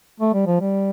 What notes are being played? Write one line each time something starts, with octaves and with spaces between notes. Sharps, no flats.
A3
G3
F3
G3